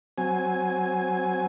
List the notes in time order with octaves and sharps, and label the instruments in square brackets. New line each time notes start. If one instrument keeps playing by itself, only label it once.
[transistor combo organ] F#3 C4 G#5